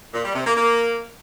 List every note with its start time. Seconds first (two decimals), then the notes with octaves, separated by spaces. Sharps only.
0.14 A#2
0.25 G3
0.35 C3
0.45 A#3
0.56 A#3